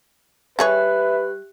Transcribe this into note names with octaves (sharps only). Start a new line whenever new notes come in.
G3 G4 G#4 B4 C#5 E5 F#6